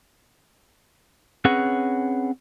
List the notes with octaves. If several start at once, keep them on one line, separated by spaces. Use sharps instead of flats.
C4 C#4 G#4 B4 C#5 F#5